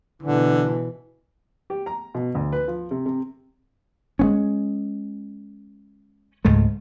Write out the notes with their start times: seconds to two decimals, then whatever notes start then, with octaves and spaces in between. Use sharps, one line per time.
0.23 B2 D3 E3
1.70 G4
1.86 A#5
2.15 B2
2.35 D2
2.52 B4
2.68 F3
2.91 C3
3.06 C3
4.19 G#3 B3 C#4
6.45 C#2 G#2 G#3 A3